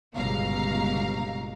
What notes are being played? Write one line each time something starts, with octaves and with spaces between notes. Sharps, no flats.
G1 C#2 B2 F5 A#5